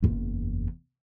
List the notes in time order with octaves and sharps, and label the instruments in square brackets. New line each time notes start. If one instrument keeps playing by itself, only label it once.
[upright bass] F#1 E2